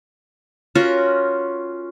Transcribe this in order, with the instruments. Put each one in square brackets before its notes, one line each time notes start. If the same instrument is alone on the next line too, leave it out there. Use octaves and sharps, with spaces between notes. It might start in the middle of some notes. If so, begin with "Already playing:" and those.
[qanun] C#4 F4 F#4 A#4